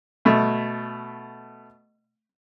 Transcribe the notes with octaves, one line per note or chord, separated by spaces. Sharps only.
B2 A3